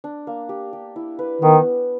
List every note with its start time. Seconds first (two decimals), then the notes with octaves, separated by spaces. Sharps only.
0.04 D4
0.27 A#3
0.49 G4
0.73 G4
0.96 E4
1.19 B4
1.41 D#3 B3